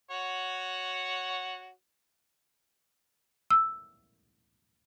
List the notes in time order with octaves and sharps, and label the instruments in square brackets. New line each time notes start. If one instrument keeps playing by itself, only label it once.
[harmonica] F#4 C#5 F#5
[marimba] E6